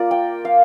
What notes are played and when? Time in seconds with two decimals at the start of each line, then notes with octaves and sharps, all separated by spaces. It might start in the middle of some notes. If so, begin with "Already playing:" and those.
Already playing: A#3 F4 A#4 D5
0.11 G5
0.45 F5